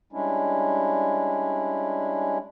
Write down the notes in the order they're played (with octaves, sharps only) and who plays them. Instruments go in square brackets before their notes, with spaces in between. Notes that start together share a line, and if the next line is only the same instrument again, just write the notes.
[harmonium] G3 G#3 C#4 D4 E4